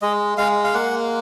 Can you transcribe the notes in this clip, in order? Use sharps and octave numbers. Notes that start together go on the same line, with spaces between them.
G#3 D#5
G#3 F5
F5
A#3 F#5